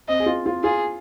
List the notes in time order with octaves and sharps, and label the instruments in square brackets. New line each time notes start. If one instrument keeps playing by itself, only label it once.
[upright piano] C4 [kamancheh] D#5
[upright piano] G#4
F4
F4
[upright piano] F4 [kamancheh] G#4